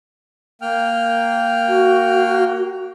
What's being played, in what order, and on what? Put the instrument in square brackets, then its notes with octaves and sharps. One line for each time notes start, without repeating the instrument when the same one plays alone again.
[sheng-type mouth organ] A#3 G5 F6
[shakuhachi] F#4